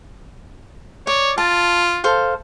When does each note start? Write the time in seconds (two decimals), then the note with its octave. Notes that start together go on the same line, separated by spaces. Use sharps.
1.07 C#5 D5
1.38 F4 A5
2.04 A4 C5 F5